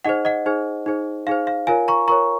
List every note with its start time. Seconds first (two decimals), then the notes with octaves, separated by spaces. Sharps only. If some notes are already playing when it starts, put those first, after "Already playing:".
0.05 D#4 G#4 C5 D#5 F#5
0.25 D#5 F#5
0.46 D#4 G#4 C5
0.86 D#4 G#4 C5
1.27 D#4 G#4 C5 F5
1.47 F5
1.67 F4 A#4 C#5 F5 G#5
1.88 A#5 C#6
2.08 F4 A#4 C#5 A#5 C#6